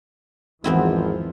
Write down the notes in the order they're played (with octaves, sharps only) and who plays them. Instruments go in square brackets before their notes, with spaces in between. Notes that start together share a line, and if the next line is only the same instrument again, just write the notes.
[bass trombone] G#1 [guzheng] E2 C4 E4 [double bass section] E3 F3